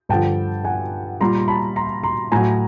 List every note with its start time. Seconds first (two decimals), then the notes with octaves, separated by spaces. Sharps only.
0.09 G2 D3 F3 G5 A5
0.65 F#5 G#5
1.21 A#2 G3 A#5 C6
1.38 C6
1.48 A5 B5
1.76 A#5 C6
2.03 A#5 C6
2.32 A2 F#3 G#5 A#5